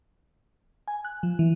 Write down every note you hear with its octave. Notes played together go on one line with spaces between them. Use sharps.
G#5
F#6
F3
E3